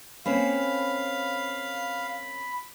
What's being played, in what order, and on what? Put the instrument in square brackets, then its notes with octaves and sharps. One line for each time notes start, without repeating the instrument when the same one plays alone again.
[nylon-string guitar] A#3 C4 C#4 [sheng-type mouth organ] F5 [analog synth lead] B5